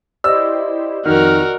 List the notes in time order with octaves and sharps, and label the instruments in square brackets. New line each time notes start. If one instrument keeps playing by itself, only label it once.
[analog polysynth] E4 G4 C5 [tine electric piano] D5 D#5 [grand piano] E6
[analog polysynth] F2 F6 [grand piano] D#3 [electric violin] F#4 A#4